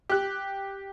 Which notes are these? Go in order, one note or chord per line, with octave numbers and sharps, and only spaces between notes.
G4 F#6